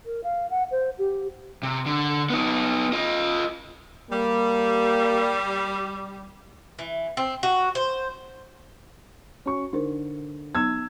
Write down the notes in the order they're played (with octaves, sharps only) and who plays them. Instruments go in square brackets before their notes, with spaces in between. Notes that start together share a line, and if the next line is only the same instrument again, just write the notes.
[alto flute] A#4
F5
F#5
C5
G4
[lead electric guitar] C3
D3
B3 D#4
F4 D#5
[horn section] G3 [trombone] A#3
[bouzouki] E3
C4
F#4
C5
[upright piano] C#4 F#4 C#6 [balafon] C#5
[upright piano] D3 [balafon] D#4 A#4 C5
[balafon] F#3 B3 D#4 [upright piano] E6 G#6